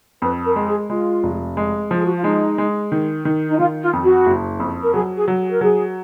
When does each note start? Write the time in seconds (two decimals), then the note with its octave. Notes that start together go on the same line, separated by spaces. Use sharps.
0.22 F2 B4
0.45 A#4
0.56 G#3
0.67 G#4
0.89 G#3 F4
1.23 F1
1.57 G#3
1.91 F3
1.96 G#4
2.05 F#4
2.15 F4
2.24 G#3 D#4
2.58 G#3
2.92 D#3
3.25 D#3
3.48 D#4
3.58 D#3 F4
3.81 F4
3.93 F2
4.04 F#4
4.26 F#1
4.60 F2
4.81 A#4
4.94 F#3 G#4
5.16 G#4
5.28 F#3
5.38 G#4
5.51 A#4
5.61 F#3 G#4